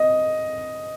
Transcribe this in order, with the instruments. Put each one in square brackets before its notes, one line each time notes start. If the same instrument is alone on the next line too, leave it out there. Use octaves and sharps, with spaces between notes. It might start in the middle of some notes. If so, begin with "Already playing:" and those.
Already playing: [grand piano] D#5